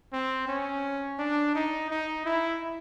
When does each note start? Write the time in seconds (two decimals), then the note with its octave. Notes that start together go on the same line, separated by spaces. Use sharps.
0.13 C4
0.48 C#4
1.19 D4
1.55 D#4
1.90 D#4
2.26 E4